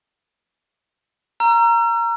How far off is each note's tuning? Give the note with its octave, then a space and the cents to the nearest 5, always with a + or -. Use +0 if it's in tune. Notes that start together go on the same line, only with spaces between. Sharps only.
A#5 +0 E6 +45